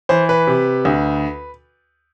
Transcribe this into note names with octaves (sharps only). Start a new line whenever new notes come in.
E3 C5
B4
C3
D2